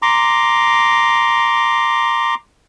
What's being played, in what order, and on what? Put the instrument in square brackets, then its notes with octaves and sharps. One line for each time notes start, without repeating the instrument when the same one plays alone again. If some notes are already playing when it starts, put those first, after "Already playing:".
[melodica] A#5 C6 D6